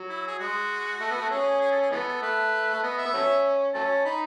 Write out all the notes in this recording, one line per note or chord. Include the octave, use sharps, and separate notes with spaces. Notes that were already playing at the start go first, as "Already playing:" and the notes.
Already playing: F#3
E4
G#4
G#3 F#4
A3
B3
A3
C#4 G#4
G#4
A4
G#4
E3 G#3 B3 A4
A4
A3 B4
A3
B3 D#5
E5
B3
F#3 A3 C#4
F#3 A3 C#4 A5
D#4 B5